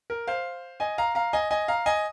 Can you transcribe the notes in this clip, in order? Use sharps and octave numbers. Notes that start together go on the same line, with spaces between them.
A#4
C5 F5
D#5 G#5
F5 A#5
F5 A#5
D#5 G#5
D#5 G#5
F5 A#5
D#5 G#5